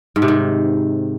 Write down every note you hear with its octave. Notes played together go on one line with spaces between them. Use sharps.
G#2
C3
D#3